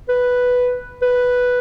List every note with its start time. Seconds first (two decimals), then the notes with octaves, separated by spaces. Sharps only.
0.09 B4
1.02 B4